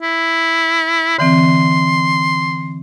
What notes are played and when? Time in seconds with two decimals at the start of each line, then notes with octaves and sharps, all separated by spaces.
0.02 E4
1.18 D3 E3 C4 C6